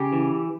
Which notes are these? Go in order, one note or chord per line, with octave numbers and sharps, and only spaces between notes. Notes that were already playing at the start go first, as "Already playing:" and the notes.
Already playing: C#3 G4
E3